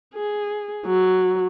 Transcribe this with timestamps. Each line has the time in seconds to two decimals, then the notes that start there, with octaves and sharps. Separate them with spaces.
0.15 G#4
0.86 F#3